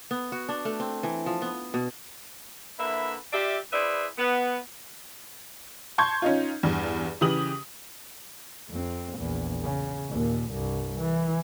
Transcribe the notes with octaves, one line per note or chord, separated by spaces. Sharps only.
B3
F#4
D4
A3
C4
E3
F3
B3
B2
D3 A#3 E4 B4 E5
F4 G4 D5 E5
E4 G#4 B4 C5 D5 E5
B3
A5 C6 C#6 G6 G#6
C#4 D#4 F4
E2 G2
C#3 E3 G4 D#6 F#7
F2 C4
A#1 E2
C#3
D#2 A#2
C2 G2
E3